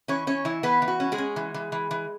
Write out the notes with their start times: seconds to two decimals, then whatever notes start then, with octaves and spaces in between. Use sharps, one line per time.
0.08 E3 C#4 C#5
0.27 E3 C#4 C#5
0.45 E3 E4
0.63 E3 B3 B4
0.82 E3
0.88 F#4
1.00 C#4
1.12 G#3 G#4
1.18 C#4
1.36 E3
1.54 E3
1.72 E3
1.91 E3